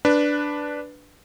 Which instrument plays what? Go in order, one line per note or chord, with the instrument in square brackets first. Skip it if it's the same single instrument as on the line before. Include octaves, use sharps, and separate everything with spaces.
[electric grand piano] D4 B4